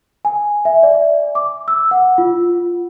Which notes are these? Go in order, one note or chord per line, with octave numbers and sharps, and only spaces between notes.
G#5
E5
D5
D6
E6
F#5
F4